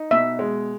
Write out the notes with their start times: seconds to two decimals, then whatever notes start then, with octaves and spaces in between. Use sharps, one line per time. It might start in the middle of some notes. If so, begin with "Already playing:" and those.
Already playing: D#4
0.11 B2 E5
0.39 G#3